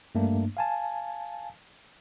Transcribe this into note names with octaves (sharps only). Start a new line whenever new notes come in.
G2 A3 A#3 D4
F5 G#5 A5